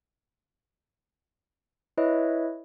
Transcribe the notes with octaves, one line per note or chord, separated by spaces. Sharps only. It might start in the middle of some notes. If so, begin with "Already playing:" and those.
E4 B4 C#5 D#5 E5